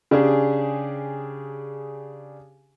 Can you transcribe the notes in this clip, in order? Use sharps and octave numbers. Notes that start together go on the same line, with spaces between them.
C#3 D4 G4 G#4